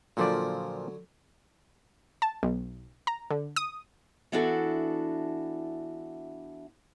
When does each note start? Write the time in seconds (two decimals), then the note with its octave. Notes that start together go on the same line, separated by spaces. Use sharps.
0.17 A#2 D3 F3 F#3 D5
2.22 A5
2.43 B1
3.07 A#5
3.30 D3
3.56 D#6
4.32 E3 B3 D4 E4 F#4 A4